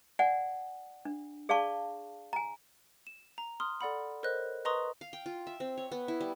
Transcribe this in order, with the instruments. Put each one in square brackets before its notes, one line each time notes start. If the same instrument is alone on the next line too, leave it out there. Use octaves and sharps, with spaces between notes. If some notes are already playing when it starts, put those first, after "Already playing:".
[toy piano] D5 F#5 G#5
D4
G#4 D5 F5 A5 C#6
G#5 A#5
[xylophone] E7
A#5
C6 D#6 F6
A4 D5 F#5 B5
A4 A#4 C5 C#5 D#5 F#6
B4 D#5 A#5 C6 C#6 D#6
[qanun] F5
G5
F4
E5
C4
C#5
B3
E4
G3